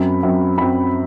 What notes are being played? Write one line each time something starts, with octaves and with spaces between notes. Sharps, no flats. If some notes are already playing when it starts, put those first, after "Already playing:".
Already playing: F#2 F#3 C4 B5
F#2 F#3 C4
F#2 F#3 C4 B5